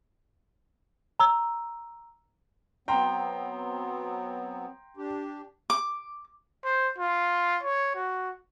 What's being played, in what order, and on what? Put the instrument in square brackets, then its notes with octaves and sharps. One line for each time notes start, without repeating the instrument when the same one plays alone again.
[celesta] A#5 E6
[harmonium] F#3 B3 C4 [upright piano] G5 A#5 C6
[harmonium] D4 G4
[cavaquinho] D6
[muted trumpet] C5
F4
C#5
F#4